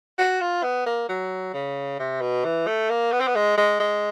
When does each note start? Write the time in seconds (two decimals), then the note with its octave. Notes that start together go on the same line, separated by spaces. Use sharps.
0.18 F#4
0.41 F4
0.63 B3
0.86 A#3
1.09 F#3
1.54 C#3
2.00 C3
2.21 B2
2.45 E3
2.67 A3
2.90 A#3
3.12 B3
3.20 C4
3.27 B3
3.35 G#3
3.58 G#3
3.80 G#3